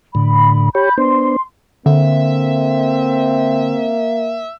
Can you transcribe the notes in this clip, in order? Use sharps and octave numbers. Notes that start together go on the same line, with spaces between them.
A2 D3 B5
G4 C#5 B5 G6
B3 D4 C5 C6
D3 A#3 C4 E5